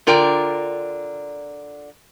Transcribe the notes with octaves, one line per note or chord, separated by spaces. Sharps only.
D3 F4 A#4 D5 G5